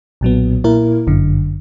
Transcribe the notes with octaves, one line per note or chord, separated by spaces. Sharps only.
B1 A#2 F#3 B3
A#2 A#3 E4 A#4
G1 F#2 D3